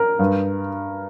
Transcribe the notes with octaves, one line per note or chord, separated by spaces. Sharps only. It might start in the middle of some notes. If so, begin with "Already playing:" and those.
Already playing: A#4
G2